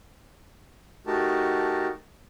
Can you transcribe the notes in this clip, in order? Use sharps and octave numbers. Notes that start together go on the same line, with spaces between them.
A3 D#4 F#4 G4 A#4 A5